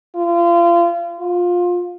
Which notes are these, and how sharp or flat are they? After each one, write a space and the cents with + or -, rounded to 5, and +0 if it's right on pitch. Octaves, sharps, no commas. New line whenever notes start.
F4 -30
F4 +20